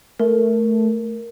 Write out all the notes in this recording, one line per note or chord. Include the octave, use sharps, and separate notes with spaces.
A3 A#4